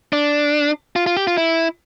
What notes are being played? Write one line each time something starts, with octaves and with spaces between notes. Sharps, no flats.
D4
F4
F4
G4
F4
E4